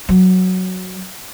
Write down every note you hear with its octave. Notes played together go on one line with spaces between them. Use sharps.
F#3